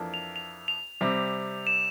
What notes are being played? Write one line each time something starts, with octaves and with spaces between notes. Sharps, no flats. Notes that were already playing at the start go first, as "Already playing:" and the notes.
Already playing: F2 E3 A#3 D4 A4
F7
F7
F7
C3 G3 C4
E7